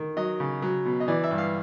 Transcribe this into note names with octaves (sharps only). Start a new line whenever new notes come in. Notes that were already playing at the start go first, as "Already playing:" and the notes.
Already playing: D#3
F#3 D#5
C#3
F#3
B2
D#5
E3 D5
E5
G2
F5